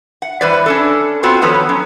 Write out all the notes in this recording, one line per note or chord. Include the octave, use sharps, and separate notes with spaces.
F#5
E3 G3 B4 C5 D5
C#4 D4 A4
B3 C4 F4 F#4 A4 C5
D#3 F3 B3 A4 B4 C#5
F#3 C#4